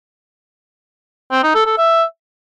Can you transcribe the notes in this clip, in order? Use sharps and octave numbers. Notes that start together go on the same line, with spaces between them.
C4
D#4
A4
A4
E5